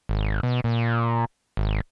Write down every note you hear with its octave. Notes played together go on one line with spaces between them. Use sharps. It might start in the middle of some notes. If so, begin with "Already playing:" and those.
G#1
B2
A#2
G#1